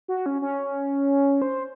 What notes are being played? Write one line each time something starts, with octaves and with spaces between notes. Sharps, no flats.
F#4
C#4
C#4
C5